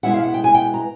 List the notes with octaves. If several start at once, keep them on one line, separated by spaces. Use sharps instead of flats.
B2 G#3 B3 E4 F#5
F5
F#5
G5
G#5
G5
A#5